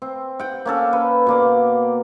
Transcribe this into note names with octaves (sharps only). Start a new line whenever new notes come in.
C4
F#5 G5
A#3 C#4 A4
B4
B2 A#3 D5